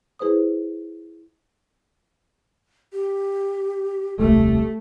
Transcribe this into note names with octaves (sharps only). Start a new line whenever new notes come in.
E4 G#4 B4 C5 D#6
G4
D#1 C2 A3 G4